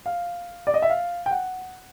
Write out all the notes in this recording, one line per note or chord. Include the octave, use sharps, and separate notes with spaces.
F5
D5
D#5
E5
F5
G5
F#5